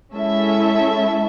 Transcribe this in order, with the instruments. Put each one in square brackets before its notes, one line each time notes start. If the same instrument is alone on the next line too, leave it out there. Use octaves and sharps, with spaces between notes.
[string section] G#3 C#4 E4 A4 E5